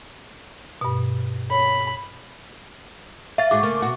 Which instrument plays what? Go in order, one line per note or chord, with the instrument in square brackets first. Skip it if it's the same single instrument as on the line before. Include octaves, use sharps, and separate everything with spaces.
[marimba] G2 B2
[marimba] C#5 [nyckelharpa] B5
[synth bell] E5 A6 [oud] F5
[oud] G#2 F#4 G#4 [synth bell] D6
[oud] C#3 A3 A#3
B2 F#4